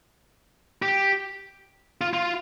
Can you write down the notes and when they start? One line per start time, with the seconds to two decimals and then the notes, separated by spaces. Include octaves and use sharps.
0.82 G4
2.01 F4
2.13 F4